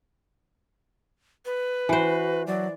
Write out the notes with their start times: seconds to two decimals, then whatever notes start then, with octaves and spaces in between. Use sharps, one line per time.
1.45 B4
1.89 E3 F#4 C5
2.47 F#3 D5